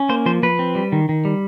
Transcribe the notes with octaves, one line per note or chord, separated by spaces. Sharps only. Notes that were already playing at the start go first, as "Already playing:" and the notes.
Already playing: C#4
A#3 C5
F3 C5
F3 B4
C4
G3
D#3
D#3
G3